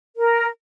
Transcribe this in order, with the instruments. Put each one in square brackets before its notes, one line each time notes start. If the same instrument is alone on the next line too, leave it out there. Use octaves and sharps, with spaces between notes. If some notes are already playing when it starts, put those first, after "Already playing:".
[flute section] A#4